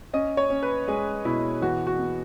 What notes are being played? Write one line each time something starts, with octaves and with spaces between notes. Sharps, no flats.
C#4 D#5
C#5
C#4
B4
G#3 G#4
B2 E4
E3 F#4
F#4
B3